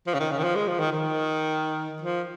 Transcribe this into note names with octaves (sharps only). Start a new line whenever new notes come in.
F3
C#3
D#3
C#3
D#3
F3
G#3
F3
D#3
D#3
F3